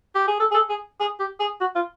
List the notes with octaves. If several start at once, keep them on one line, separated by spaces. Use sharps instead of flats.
G4
G#4
A4
G#4
A4
G#4
G#4
G4
G#4
F#4
F4